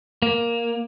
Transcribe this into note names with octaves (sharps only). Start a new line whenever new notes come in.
A#3